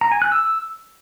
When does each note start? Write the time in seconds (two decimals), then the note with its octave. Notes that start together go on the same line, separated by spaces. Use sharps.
0.01 A#5
0.12 G#5
0.22 F#6
0.32 E6